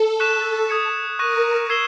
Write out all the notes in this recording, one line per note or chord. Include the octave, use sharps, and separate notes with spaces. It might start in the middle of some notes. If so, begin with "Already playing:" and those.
Already playing: A4
C#6 F#6 B6 E7
D#6 G#6 C#7
A#4 C#6 F#6 A#6 D#7
E6 G#6 C7 E7 G7